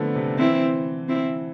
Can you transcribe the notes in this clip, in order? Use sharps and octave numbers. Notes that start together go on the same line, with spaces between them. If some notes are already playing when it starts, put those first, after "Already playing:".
Already playing: D3 F3 A3 B3 C4
C3
E3 C4 E4
C4 E4